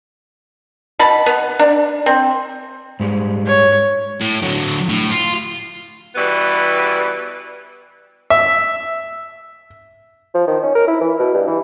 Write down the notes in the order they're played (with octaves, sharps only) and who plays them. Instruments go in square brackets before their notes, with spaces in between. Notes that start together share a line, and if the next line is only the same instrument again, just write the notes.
[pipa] B2 A5 B5
B3
D4
C4
[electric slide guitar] G#2 G3 G#3
[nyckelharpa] C#5
[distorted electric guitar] A2
D3 F#3
A2
F4
[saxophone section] B2 E3 G3 B3
[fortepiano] E5
[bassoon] F3
D#3
C#4
A#4
E4
E3
B2
G2
E3